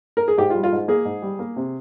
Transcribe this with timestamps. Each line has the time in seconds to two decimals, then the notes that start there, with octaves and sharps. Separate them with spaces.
0.17 A#4
0.28 G#4
0.37 G#2 G4
0.50 F4
0.55 G3
0.63 F4
0.72 G#2
0.88 A#3 G#4
1.05 G#2
1.22 G3
1.39 A#3
1.56 C3